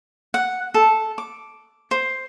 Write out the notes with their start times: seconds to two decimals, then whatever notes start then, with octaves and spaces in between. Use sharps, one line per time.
0.34 F#5
0.74 A4
1.18 D6
1.91 C5